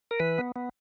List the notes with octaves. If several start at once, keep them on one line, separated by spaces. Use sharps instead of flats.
A#4
E3 B4
B3
B3